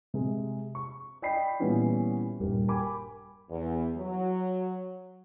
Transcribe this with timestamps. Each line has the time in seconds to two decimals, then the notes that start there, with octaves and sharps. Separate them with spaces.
0.14 C3 G#3
0.75 C#6
1.22 D5 D#5 G5 B5 B6 C7
1.60 A#2 E3 G3 B3 C#4 E4
2.40 D#1 G2 G4 A#4
2.68 A#4 G5 G#5 B5 D6
3.50 E2
3.97 F#3